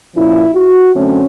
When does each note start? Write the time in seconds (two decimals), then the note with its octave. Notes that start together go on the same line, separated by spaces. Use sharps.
0.14 A#2 F3 A#3 C#4 E4
0.54 F#4
0.94 F#2 D3 F#3 A3 C4 C#4